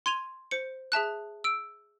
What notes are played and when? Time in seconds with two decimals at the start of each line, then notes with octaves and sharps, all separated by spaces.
0.06 C6 G#6 D#7 F7
0.51 C5 C#7
0.92 G#4 E5 A5 F#6
1.44 E6 D7